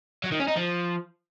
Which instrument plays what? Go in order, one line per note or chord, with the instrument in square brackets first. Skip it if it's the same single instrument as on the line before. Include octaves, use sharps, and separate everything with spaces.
[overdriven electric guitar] F#3
D#3
C#4
D#4
F3